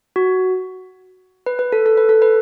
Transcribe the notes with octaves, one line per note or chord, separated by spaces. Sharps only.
F#4
B4
B4
A4
A4
B4
A4
B4